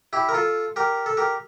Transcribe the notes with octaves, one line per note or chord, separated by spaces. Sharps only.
E4 G4
A#4
F4 A4
G4 A#4
A4
G4 A#4